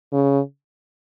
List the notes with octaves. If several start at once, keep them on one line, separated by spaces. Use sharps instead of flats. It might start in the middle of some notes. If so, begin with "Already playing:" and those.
C#3